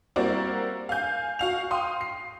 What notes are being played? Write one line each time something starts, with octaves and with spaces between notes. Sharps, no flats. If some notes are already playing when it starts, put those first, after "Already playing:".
G3 A#3 C4 E4 F#4 D5
F5 G#5 G6
F#4 F5 F7
F5 G5 C6 D#6
C7